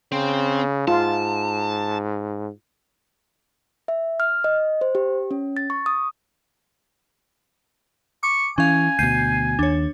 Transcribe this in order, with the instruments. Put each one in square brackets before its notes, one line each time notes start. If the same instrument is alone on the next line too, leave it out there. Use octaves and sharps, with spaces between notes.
[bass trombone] C#3 [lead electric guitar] C4
[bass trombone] G#2 [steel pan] F4 [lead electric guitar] A5
[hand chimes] E5
F6
D#5
C5
G4
C#4
A6
C#6
D#6
[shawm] C#6 [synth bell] D6
[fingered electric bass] E3 [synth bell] C#4 F5 [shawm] G#5
[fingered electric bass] D2 B2 [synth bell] G6 C7 D#7
[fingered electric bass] D#2 [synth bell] D4 C#5